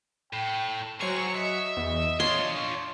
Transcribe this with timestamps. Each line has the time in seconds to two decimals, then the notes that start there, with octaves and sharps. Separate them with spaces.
0.33 A2 G5
1.01 F#3 G#4 A#4 C5 C#6
1.36 D#5 E5
1.77 E2
2.20 D4 F4 C#5 C6